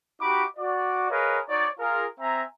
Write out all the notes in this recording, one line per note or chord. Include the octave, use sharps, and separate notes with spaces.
D#4 F#4 G4 B5 D6
F#4 D5
G#4 A#4 B4 C#5 D#5 F5
D#4 F#4 C#5 D5
F4 G#4 A#4
C4 E5 G#5 A#5